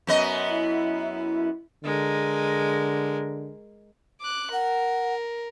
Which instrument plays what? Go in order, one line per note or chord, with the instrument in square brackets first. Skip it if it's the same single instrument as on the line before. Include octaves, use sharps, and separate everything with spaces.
[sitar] F#2 B3 D#5
[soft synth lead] E4
[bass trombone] D3 [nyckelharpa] G#3 A#4
[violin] D6 F#6
[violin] A#4 [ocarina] F#5